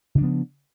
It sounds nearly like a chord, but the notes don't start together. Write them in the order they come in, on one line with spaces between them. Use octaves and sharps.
C#3 D4 F3 B3